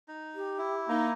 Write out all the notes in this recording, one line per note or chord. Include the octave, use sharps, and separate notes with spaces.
D#4
G4
E4
A#3 D#4